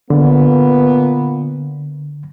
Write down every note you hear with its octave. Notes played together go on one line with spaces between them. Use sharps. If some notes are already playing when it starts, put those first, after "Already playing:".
A#2 D3 A#3 B3